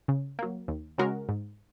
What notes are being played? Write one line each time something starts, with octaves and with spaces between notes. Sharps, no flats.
C#3
F#3 A#3
D#2
C#3 G#3 F#4 A#4
G#2